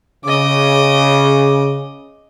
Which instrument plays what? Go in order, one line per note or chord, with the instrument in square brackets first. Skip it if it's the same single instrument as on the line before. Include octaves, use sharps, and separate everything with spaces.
[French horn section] C#3 [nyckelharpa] D#5 D6